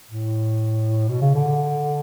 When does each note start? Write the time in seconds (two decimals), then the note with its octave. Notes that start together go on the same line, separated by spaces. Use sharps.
0.11 A2
1.09 B2
1.21 C#3
1.35 D3